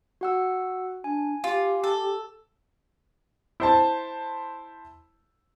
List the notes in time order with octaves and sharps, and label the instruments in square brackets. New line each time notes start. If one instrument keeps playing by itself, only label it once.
[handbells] F#4 F#5 E6
[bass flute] D4 [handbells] G#5
[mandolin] F4 [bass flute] G4
[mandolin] A4
[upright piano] E4 C5 A5